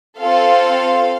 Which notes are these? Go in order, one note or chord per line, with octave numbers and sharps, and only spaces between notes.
C4 F4 A4 F5